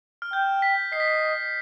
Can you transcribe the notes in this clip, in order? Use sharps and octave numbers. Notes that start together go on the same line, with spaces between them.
F6
G5 G6
B6
D#5 C7
B6
C7